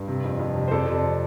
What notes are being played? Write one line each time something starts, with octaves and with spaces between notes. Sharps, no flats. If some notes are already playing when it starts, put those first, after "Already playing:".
Already playing: G2
C3
F2
F2
C3
C5
F2 A4 D5
C3